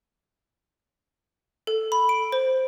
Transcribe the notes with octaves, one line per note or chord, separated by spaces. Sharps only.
A4
B5
D7
C5